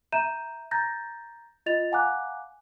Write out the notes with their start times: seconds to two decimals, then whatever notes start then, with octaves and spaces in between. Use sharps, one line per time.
0.12 E5 A#5 G6 D#7 E7
0.71 A#5 G6 A6 A#6
1.66 F4 D#5 A6 F7
1.92 F5 F#5 G#5 A#5 D6 F#6